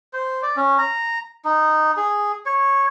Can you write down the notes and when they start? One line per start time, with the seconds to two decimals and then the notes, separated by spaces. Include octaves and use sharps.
0.13 C5
0.43 D5
0.56 C#4
0.78 A#5
1.45 D#4
1.97 G#4
2.46 C#5